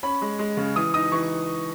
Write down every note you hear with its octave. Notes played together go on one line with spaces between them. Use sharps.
C#4 B5
G#3
G#3
C#3
E3 D#6
D#4 D#6
E3 C#6